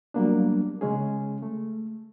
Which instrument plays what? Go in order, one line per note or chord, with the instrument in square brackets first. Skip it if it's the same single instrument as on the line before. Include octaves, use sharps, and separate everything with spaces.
[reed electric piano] F#3 G3 A#3 B3 D4
C#3 G#3 C#4 G#4
A3